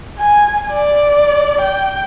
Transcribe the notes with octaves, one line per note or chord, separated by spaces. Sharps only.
G#5
D5
G5